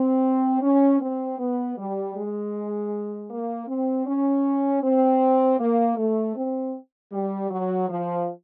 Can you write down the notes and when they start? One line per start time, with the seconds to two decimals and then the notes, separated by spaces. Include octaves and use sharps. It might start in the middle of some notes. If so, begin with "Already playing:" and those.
Already playing: C4
0.62 C#4
1.01 C4
1.39 B3
1.77 G3
2.15 G#3
3.31 A#3
3.68 C4
4.06 C#4
4.83 C4
5.59 A#3
5.97 A3
6.36 C4
7.12 G3
7.51 F#3
7.89 F3